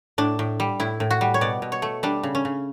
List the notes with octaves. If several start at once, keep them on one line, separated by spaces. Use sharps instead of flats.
A2 D4
A2
G3
A2 E4
A2
F#4
G3
C#5
B2 D5
B2
C#5
A3
G3 D4
C#3
C#4
C#3